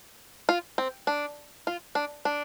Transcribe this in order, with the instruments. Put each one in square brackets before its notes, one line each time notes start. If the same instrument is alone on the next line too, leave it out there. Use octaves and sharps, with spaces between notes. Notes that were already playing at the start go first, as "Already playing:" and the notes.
[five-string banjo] F4
C4
D4
F4
D4
D4